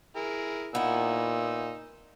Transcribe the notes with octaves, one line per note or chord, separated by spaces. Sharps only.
E4 G#4 A#4
A#2 B3 D#4 E4 E6